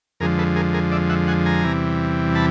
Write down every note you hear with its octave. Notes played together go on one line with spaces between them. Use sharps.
F2 D3 F3 G#3 G#4 A#4
A4 B4
G#4 A#4
G#4 A#4
D5 E5
E5 F#5
F#5 G#5
G#5 A#5
E2 C3 E3 G3
A5 B5